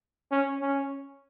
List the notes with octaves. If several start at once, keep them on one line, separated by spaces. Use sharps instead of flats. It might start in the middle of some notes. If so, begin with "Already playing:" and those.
C#4
C#4